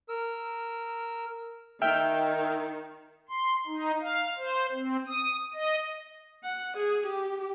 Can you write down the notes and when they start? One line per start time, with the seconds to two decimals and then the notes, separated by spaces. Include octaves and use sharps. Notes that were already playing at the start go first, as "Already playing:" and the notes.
0.09 A#4 E6
1.82 D#3 E5 G5 F6
3.29 C6
3.67 D#4
4.01 F5
4.38 C5
4.72 C4
5.07 D#6
5.54 D#5
6.44 F#5
6.77 G#4
7.06 G4